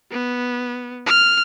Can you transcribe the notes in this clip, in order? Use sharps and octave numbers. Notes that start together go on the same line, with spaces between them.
B3
F6